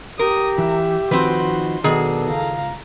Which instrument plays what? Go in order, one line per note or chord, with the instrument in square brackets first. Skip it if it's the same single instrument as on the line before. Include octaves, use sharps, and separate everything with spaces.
[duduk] G4 [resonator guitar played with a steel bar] A#4 [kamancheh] D#6
[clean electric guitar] E3 [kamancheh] E5
[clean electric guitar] D#3 F3 D#4 [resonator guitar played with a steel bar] C4 B4 [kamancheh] F#4 C6
[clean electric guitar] B1 B3 F#4 [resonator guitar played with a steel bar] D#3 G#4 [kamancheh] D4 [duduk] A4
[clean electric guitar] C#2 [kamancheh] F5 A#5